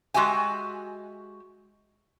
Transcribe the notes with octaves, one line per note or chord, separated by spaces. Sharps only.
G#3 F#4 G4 E5 G#5